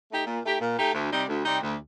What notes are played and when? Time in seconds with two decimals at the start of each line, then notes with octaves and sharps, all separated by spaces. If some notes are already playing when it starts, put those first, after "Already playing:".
0.10 A3 D#4 G4
0.27 A#2
0.44 A3 D#4 G4
0.61 A#2
0.78 A3 D#4 G4
0.95 D2
1.12 C3 G3 C4 D#4
1.29 D2
1.45 C3 G3 C4 D#4
1.62 D2